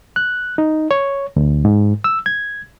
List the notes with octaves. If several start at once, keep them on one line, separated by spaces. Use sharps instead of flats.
F#6
D#4
C#5
D2
G#2
E6
G#6